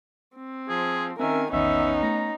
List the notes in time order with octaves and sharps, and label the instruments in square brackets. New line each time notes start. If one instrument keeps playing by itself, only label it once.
[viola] C4
[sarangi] F3 [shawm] G#4
[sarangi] D#3 [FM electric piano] C4 C#4 [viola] A#4 G#5 [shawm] E5
[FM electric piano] A#1 E2 D#3 [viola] B3 C#4 [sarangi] D#4 [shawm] E5
[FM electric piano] A3 [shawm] A#5